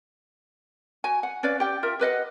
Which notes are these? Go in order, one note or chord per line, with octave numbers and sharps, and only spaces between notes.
F#4 G#5
F#5
C#4 B4 D5 F5
G4 G5
F4 A#4 E5
G4 B4 D#5 F#5